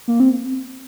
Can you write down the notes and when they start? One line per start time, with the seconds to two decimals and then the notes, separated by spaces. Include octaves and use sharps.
0.08 A#3
0.20 C4